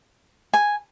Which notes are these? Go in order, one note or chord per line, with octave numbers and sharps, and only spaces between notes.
G#5